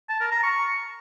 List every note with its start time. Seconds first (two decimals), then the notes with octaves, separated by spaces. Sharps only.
0.09 A5
0.21 A#4
0.32 A#5
0.43 C#6